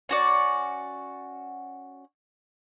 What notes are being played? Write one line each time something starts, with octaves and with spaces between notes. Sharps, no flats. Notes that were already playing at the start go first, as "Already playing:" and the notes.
C#4 F#4 D5